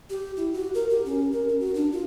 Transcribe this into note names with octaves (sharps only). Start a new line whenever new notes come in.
G4
E4
F#4
A#4
G4
C#4
A#4
C#4
F#4
D4
F4